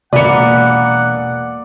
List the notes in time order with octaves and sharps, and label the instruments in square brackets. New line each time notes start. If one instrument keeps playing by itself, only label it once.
[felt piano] E1 C#7 [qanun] A#3 B4 [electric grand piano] D5 [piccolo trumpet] F#5